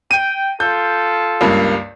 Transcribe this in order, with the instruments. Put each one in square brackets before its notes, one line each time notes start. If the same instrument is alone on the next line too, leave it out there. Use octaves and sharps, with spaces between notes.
[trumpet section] G5 [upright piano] D#7
[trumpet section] F4 A4 [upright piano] G6
[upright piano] C#2 G2 A#3